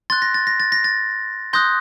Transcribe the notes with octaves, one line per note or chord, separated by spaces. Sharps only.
C6 F#6 A6
A#6
A6
A#6
A6
A#6
A6
C6 D#6 F#6 G6 A#6